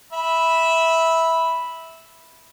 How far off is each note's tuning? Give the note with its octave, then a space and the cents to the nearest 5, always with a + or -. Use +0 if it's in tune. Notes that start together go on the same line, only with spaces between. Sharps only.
E5 -10 B5 -5